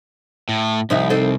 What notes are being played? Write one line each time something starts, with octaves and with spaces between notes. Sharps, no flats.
A2
C2 F3 D#4 E4
C4 D#4 A4